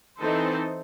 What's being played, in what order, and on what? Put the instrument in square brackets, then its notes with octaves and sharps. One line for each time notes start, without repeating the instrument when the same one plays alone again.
[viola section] E3 C4 D#4 A4 C5